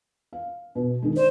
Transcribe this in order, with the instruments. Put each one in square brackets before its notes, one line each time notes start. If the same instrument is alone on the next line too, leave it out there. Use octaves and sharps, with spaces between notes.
[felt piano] F5
B2
D#3 G#3
[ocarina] C5 [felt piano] D5